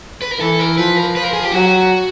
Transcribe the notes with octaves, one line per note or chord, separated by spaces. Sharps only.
B4
A#4
E3 A4
A#4
F3 B4
A#4
F3 B4
A#4
G#4
G4
F#3 F#4